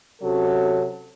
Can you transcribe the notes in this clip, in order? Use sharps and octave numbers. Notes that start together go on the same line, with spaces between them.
C3 F#3 C#4 F#4 A4